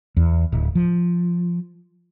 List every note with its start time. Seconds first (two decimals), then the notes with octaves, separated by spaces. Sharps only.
0.17 E2
0.52 D1
0.75 F3